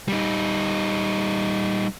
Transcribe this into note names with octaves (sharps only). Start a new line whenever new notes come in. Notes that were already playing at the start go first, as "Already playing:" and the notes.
G3 D#4